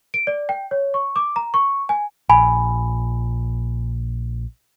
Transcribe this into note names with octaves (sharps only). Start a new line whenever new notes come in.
D7
D5
G5
C#5
C#6
D6
A#5
C#6
G#5
A#1 G#5 B5